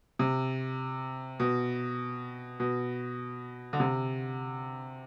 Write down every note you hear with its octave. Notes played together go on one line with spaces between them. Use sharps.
C3
B2
B2
D3
C3